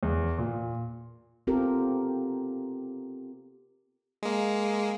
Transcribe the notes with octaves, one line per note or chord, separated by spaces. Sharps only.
E2
A#2
B3 C4 F4 G4 A4 A#4
G#3 A#3